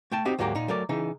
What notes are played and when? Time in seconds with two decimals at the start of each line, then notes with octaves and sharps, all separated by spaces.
0.12 A3 G5 A5
0.25 C4 D#4 F#4 G4 D#5
0.39 D2 G#2 F#3 A#3 G4 A#4
0.55 A#2 D#4
0.68 F#3 A3 A#4 D5
0.89 C#3 E3 D#4